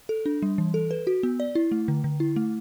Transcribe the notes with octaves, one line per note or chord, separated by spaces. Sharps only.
A4
D4
G3
E3
A4
B4
F#4
B3
D5
E4
A3
D3
D3
E4
A3